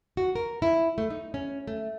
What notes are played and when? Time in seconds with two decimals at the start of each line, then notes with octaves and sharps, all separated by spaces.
0.17 F#4
0.36 A#4
0.62 E4
0.98 A3
1.10 D#4
1.34 C#4
1.68 A3